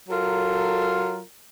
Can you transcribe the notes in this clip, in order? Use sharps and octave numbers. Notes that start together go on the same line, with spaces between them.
F#3 F4 A4 A#4